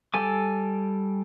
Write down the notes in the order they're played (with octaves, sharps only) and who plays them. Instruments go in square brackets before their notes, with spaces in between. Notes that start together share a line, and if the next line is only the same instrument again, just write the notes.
[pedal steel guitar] G3 A4 G#5 D6